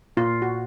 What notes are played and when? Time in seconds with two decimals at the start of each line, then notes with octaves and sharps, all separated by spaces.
0.17 A#2 F4
0.42 F#4